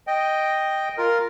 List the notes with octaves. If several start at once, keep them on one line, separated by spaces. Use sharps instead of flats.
D#5 G5
F4 A#4